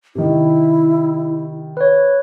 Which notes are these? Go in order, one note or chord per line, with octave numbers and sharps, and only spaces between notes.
C3 D#3 E4
B4 C#5